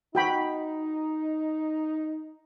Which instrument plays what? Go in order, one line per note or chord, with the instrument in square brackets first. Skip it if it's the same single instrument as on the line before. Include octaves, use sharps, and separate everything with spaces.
[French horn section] D#4 [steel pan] F#4 G5 B5